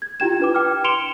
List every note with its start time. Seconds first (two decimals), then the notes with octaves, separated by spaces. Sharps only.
0.02 G#6
0.20 E4 F4 G4 G5 G#6 E7
0.40 D4 B4 D6
0.54 G5 D6 F6
0.84 C6 C#7 D7 E7 F7 G7